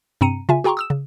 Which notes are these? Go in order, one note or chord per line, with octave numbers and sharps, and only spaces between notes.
G2 C3 C4 A#5 C#7 D#7
C#3 F4 E5 G#5
F#4 G#4 G5 A#5 C6 C#6
D#6 E6 E7
C#3